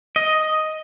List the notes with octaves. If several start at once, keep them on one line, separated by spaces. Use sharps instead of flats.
D#5